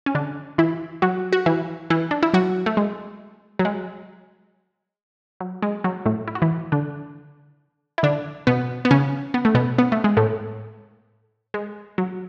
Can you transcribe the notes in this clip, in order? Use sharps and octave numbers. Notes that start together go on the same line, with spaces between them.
C#4
D3 D4
E3 E4
F#3 F#4
F#4
E3 E4
E3 E4
D4
E4
F#3 F#4
A3
G#3
F#3
G#3
F#3
G#3
F#3
A2 A3
E4
F#4
E3 E4
D3 D4
E4
D3 D4
B2 B3
B3
C#3 C#4
B3
A3
B2 B3
B3
A3
G#3
A2 A3
G#3
F#3